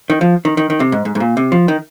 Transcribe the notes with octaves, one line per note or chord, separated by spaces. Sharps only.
D#3
F3
D#3
D#3
D#3
C3
G#2
G#2
G#2
A#2
C3
F3
D#3